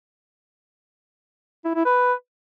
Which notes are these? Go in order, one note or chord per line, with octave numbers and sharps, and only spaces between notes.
E4
E4
B4